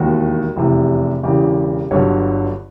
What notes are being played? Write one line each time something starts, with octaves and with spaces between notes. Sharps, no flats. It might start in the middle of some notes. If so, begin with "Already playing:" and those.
Already playing: E1 D#2 D#3 F#4
F1 E2 C3
E1 E2 C#3 G4
G1 G2 D3 F#3 C#5